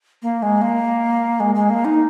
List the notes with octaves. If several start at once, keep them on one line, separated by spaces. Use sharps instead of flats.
A#3
G#3
A#3
G#3
G#3
A#3
D#4